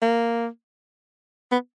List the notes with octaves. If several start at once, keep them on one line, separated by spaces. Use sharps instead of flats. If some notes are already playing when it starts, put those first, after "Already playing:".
A#3
B3